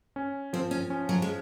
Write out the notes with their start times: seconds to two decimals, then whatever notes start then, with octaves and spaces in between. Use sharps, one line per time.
0.16 C#4
0.53 F3 C4
0.71 C#4
0.90 C#4
1.09 F#3
1.22 G#3